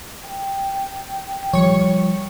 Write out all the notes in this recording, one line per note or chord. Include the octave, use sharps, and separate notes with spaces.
G5
F3 G3 C#5 C#6